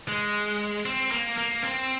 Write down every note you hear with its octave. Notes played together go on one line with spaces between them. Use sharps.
G#3
C4
A#3
A#3
C4